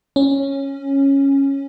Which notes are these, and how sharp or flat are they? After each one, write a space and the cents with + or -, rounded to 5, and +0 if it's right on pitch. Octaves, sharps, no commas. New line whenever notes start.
C#4 -10